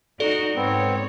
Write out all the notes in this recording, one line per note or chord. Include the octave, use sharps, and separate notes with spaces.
D#4 F#4 A4 D5
G#2 B3 C4 C#5